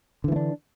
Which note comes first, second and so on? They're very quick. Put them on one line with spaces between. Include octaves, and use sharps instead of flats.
D3 E3 A3 D4